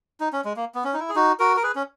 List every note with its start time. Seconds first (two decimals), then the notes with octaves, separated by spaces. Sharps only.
0.20 D#4
0.33 C#4
0.45 G#3
0.56 A#3
0.75 B3
0.84 C#4
0.94 D#4
1.00 E4
1.09 G#4
1.15 D#4 F#4
1.39 F#4 A#4
1.57 A#4
1.63 G#4 B4
1.75 C#4